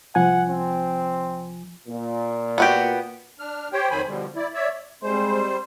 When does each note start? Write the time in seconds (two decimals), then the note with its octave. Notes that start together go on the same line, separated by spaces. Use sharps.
0.15 C2 F3 F#5 G#5
0.49 C4
1.88 A#2
2.58 B3 F#4 G4
3.39 D4 F6
3.73 G4 C5 C#5 G5
3.90 F2 D#3 F#3 C5 G#5 B5
4.08 B2 D3 F3 G3
4.36 E4 D5
4.54 C#5 D5 E5
5.03 G3 G#3 C4 C5 C6